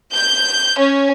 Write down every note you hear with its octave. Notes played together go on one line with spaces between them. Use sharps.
G6
C#4